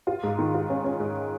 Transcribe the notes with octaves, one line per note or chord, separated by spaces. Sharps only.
F4
G#2
D#3
F4
C#4
C#4
G#2